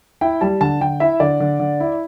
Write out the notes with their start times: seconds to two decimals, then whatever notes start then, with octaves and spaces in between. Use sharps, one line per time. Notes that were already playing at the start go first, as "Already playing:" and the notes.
0.21 E4 G5
0.41 G3 A5
0.61 D3 A5
0.81 D3 G5
1.00 E4 E5
1.20 D3 D5
1.40 D3
1.60 D3
1.80 E4